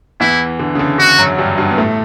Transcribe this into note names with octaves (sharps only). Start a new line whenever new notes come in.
E2 E3 E4
D3
C#3
D3
D3 F#4
F#2 F#3
G2 G3
G2 G3
B3
A2 A3